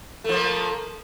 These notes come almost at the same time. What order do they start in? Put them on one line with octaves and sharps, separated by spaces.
A3 F3 A#3